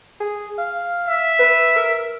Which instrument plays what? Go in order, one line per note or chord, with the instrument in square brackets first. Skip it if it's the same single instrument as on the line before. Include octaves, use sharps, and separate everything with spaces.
[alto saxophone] G#4
F5
[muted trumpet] E5
[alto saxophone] B4
A#4